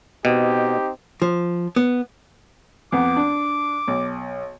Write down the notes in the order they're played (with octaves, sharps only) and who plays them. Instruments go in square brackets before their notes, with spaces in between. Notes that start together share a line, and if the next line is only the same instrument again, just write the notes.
[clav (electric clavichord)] B2 [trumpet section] C4 D#4 G4
[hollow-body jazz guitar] F3
B3
[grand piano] F2 B3 [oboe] D6
[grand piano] D4
B1